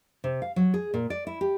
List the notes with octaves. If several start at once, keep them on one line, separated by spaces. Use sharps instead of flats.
C3
F5
F#3
G#4
A#2
D5
E4
G4